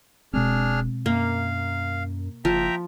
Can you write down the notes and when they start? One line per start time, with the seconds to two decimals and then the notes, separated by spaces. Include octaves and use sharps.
0.34 E1 B2 G#3 C4 D4 G#4 F6
1.06 F#2 A#3 F5
2.45 F#1 F3 E5 G5 A#5